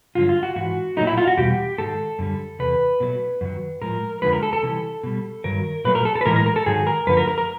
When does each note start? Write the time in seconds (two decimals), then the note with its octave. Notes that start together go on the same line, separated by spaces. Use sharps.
0.15 G2 D3 F#3 F4
0.29 F4
0.43 F#4
0.56 G#2 E3 F#4
0.97 A#2 F#3 A3 D#4
1.07 E4
1.18 F4
1.28 F#4
1.37 E2 B2 G3 G4
1.78 G#2 D#3 G#3 A4
2.19 F#2 D3 G3
2.59 E2 C3 B4
3.00 B2 F#3 A3
3.41 F#2 D#3 F#3
3.81 A2 F3 G#3 A#4
4.22 F2 D3 F3 G#3 B4
4.33 A#4
4.43 A4
4.53 A4
4.63 C3 E3 G3
5.03 B2 G3
5.44 G2 D#3 F#3 A#4
5.84 A#2 F#3 A3 B4
5.95 A#4
6.05 A4
6.16 A4
6.21 B4
6.26 A2 E3 G#3 A#4
6.36 A#4
6.46 A#4
6.56 A4
6.66 G#2 D#3 F#3 G#4
6.87 A#4
7.07 F#2 D3 F3 A3 B4
7.17 A#4
7.27 A#4
7.38 A#4